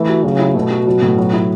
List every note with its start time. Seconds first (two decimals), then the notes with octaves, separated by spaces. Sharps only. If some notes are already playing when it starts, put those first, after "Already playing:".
Already playing: E3 A3
0.09 F#4
0.24 C#3 F#3
0.39 E4
0.55 B2 A3
0.71 F#4
0.87 F#3
1.02 A2
1.18 F#3
1.33 E4